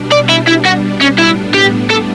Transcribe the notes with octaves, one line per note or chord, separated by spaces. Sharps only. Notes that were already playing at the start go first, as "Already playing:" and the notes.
Already playing: B2 G3 D4
D5
E4
E4
F#4
C#4
A2 G3 B3 D4 E4
G4
A4